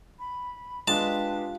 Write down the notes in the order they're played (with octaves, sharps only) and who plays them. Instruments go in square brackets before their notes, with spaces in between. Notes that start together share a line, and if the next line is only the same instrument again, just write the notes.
[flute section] B5
[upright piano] G#3 [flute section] D4 B4 [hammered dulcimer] F4 G4 [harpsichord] A5